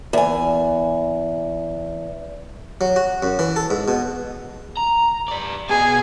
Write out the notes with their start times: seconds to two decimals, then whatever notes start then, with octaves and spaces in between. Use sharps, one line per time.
0.13 E2 G#5
2.81 F#3
2.96 F#4
3.23 F#2
3.39 E3
3.56 A4
3.71 G#2
3.88 B2
4.77 A#5
5.28 B4 D5
5.69 B2 B3 G#4